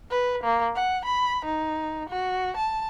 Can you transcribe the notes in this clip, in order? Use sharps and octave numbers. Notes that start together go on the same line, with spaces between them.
B4
A#3
F#5
B5
D#4
F#4
A5